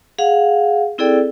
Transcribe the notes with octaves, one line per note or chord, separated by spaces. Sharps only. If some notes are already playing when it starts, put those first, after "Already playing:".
G#4 F5 F#5
C4 E4 G#4 A4 D5 G5